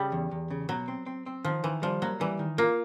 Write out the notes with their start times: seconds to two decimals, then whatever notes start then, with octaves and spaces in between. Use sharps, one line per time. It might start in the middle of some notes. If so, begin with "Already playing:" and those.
Already playing: C#3 G3
0.12 E2
0.31 E2
0.51 C#3
0.69 B2 F#3
0.88 C4
1.06 C4
1.26 C4
1.44 D#3 F3
1.64 D#3 E3
1.82 F3 G3
2.02 F#3 A#3
2.20 E3 G3
2.39 D#3
2.58 A#3 F4